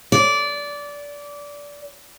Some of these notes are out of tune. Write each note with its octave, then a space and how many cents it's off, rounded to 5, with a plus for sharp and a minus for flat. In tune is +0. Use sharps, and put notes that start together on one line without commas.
D5 -20